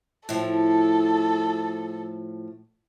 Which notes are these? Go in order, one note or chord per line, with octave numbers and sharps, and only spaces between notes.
A2 F3 A4